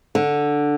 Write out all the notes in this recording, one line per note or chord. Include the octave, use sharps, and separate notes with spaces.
D3